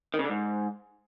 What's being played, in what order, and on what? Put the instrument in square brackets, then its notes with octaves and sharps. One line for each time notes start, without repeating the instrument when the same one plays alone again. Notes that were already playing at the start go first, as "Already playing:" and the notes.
[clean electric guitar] D#3
C#3
D3
G#2